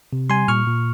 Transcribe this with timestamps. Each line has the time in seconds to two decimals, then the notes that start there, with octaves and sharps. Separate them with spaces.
0.13 C3
0.30 G3 G#5 C6
0.48 A#2 C#6 F6
0.67 A#2